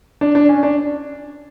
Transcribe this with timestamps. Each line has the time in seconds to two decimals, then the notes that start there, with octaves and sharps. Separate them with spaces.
0.21 D4
0.35 D4
0.49 C#4
0.63 D4